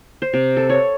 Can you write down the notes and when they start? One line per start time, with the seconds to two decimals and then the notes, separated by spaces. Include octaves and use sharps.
0.22 C5
0.34 C3
0.57 A4
0.70 C#5